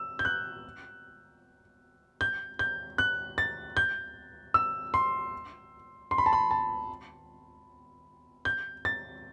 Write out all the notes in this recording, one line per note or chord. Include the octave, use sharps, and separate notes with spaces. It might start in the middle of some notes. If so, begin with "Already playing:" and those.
Already playing: E6
G6
F#6
G6
G6
F#6
A6
G6
E6
C6
C6
B5
A5
B5
A5
G6
A6